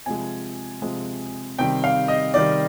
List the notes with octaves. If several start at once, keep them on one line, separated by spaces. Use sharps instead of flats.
C3 F3 G#3 G#5
C3 F3 G#3
C3 D#3 G3 G5
F5
D#5
C3 D#3 G3 D5